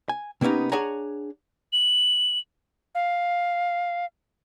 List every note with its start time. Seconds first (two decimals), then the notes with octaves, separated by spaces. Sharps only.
0.09 G#5
0.41 C3 A#3 B3 C#4 D#4
0.72 D4 G#4 C#5 F#5 G#5 A#5
1.73 F#7
2.95 F5